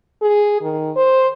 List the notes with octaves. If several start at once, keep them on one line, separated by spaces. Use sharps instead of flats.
G#4
D#3
C5